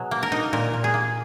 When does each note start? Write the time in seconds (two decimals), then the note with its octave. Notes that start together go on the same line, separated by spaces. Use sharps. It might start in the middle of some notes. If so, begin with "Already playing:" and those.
Already playing: B2 F#3 G#4
0.11 A#3
0.23 A#4
0.32 D#4
0.53 A#2 A#4
0.74 A#2
0.84 G#4
0.94 A#3